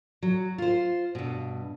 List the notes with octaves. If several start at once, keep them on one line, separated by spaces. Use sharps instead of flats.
F#3
F4 C5
G2 B2